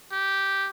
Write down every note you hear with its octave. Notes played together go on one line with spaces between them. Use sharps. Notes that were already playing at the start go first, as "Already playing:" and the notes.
G4